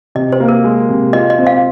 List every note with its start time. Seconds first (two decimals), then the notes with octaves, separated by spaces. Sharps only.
0.15 C3 D#5
0.32 C5
0.40 A#3
0.48 A#4
0.64 G#3
0.89 C3
1.13 F4 D#5
1.30 D#5
1.38 C4
1.47 F5